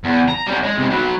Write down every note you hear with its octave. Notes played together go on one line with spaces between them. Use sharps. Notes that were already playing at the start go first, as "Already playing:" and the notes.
E2
A#5
G3 C#4
G#3
C3 G#3
F#3 B4